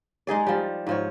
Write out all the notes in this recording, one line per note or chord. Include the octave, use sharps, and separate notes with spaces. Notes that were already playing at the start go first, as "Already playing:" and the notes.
G#3 D#4 G#4 D5
F3 G3
G#2 F3 C#5